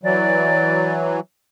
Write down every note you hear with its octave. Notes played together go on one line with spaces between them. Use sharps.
E3 F#3 D5